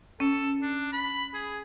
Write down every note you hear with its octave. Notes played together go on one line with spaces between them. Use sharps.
C#4 A4
D4
B5
G#4